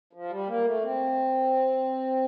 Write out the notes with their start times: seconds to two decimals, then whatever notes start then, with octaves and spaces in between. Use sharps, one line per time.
0.13 F3
0.30 G3
0.47 A#3
0.65 A3
0.82 C4